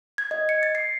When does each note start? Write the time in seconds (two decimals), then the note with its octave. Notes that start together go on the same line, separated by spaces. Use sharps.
0.18 G#6
0.31 D#5
0.49 C#7
0.63 A6
0.75 C7